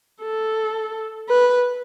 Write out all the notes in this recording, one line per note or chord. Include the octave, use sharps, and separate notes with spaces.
A4
B4